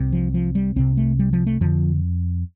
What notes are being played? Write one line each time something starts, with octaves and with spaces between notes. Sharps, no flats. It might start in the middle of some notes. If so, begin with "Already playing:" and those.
Already playing: C2 C3
F3
F3
G3
C2 C3 C4
A3
G3
F3
A3
F2 D3 F3